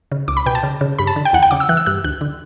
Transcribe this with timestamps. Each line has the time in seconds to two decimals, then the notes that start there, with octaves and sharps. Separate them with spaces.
0.12 C#3
0.28 C#2 D6
0.37 B5
0.46 B2 G5
0.55 A5
0.63 C#3
0.81 C#3
0.99 G2 B5
1.07 A5
1.16 D3
1.25 G5
1.33 E2 F#5
1.43 G5
1.51 C#3 D6
1.60 E6
1.69 E3 F#6
1.77 E6
1.86 G2 F#6
2.04 D2 F#6
2.21 D3